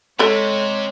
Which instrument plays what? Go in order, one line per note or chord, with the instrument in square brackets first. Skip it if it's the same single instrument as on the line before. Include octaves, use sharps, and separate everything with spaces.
[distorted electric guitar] C3 [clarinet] G#3 [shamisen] A4 E5 B5 [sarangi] C#5